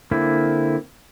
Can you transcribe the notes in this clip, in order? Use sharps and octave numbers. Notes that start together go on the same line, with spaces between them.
D3 A#3 C4 E4